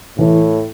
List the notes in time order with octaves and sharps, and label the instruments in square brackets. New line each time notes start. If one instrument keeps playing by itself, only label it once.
[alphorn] A2 [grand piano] E3